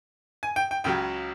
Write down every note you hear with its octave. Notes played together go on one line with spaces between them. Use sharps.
G#5
G5
G5
C#2 C#3 F#3 G5